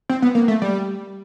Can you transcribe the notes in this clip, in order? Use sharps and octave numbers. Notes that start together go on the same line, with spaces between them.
C4
B3
A#3
A3
G3